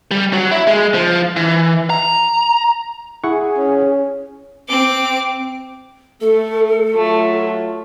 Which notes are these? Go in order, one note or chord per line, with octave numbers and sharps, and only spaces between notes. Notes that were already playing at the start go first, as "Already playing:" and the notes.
G3
F#3
E4
G#3
F3
E3
A#5
E4 G#4 F#5 C#6
C#4
C4 D6
A3 A4
F#3 A3 F4